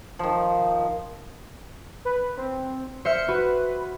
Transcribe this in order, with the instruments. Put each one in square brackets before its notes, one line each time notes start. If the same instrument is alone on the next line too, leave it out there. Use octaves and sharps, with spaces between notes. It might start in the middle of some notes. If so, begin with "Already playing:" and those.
[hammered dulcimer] D#3 F3
[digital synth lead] B4
C4
[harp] C5 E5 F6 [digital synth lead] C#7
[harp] F#4 [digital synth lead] B4